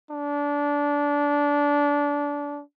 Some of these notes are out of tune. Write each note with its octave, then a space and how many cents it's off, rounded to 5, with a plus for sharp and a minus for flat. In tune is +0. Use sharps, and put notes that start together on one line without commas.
D4 -20